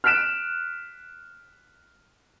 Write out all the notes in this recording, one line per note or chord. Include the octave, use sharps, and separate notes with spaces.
F6 F#6 B6 D7 E7